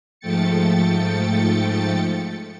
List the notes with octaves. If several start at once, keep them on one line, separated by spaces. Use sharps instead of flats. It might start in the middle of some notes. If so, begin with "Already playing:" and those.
G#2 F3 A3 G5 A6 C#7